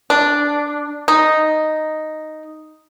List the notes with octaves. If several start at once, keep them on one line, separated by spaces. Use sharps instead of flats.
D4
D#4